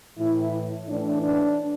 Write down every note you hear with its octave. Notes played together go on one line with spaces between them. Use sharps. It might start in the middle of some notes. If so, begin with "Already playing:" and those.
A2 E3 E4
A2 E3 D4
D4